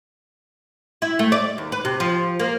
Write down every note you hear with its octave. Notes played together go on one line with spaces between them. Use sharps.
E4
A3
D5
D#2
B4
C3
F3
A#3